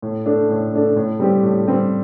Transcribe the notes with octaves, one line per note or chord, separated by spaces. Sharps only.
A2
A3 D4 A4
A2
A3 D4 A4
A2
G3 C4 G4
A2
G3 C4 G4